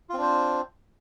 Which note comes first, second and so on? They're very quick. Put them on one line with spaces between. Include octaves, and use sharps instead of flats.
F4 C4 D4 C5